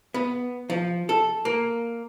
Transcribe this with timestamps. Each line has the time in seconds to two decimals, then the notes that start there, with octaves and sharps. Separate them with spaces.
0.14 B3
0.70 F3
1.09 A4
1.45 A#3